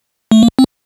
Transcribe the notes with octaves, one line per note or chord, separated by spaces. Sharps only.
A3
A#3
C4